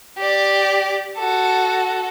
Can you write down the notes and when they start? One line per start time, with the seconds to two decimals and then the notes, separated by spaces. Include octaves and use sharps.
0.18 G4 D5
1.18 F#4 A4